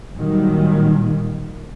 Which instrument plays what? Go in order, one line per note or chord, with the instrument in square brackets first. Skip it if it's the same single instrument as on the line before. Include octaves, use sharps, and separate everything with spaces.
[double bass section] A#2 D#3 F#3 G3